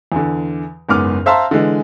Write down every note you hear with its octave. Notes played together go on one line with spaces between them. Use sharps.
E2 D3
F#1 G#2 B3 D6 F6
C5 E5 F5 A5 A#5 C6
D3 E3 G#3